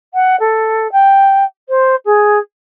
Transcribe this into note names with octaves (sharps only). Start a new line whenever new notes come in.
F#5
A4
G5
C5
G#4